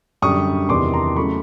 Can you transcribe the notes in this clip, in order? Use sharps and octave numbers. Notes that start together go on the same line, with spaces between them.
F#2 D3 G3 C#6 D#6
E2 C3 D#3 G3 C6 D6
A#5 C6
C#3 F#3 A3 B5 C#6